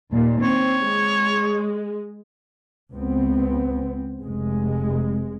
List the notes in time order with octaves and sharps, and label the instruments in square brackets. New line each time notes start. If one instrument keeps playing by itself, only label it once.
[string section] D#2 A#2
[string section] C4 [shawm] C#5
[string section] G#3
[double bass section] C#2 B3 C4
F1 G#3